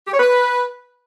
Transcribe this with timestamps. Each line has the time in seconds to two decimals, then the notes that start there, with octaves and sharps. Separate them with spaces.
0.07 G4
0.13 C#5
0.19 B4